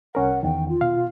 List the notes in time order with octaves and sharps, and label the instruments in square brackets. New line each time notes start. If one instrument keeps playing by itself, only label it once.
[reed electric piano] C2 C#4 A#4 [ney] F#5
[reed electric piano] E2 D#3 [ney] G5
[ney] F4
[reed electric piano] B2 F5